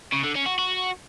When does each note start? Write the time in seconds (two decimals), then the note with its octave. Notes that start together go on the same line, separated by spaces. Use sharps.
0.13 C#3
0.24 D3
0.36 C#4
0.46 F#4
0.58 F#4